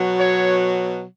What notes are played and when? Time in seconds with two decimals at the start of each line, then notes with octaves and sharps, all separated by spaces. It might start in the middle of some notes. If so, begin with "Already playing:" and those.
Already playing: B2 F#3
0.17 C#5